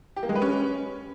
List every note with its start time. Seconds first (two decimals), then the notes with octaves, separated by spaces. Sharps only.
0.16 G4
0.23 A#3
0.29 G#3
0.35 B4
0.42 C#4